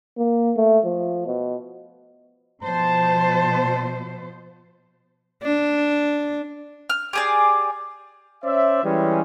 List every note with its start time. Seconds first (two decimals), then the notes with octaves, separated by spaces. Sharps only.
0.18 A#3
0.57 A3
0.85 F3
1.26 B2
2.63 B2 F3 C5 A5
5.43 D4
6.90 F6
7.13 G4 G#4 D5
8.44 C#4 C5 D5 E5
8.84 E3 G3 G#3 C#4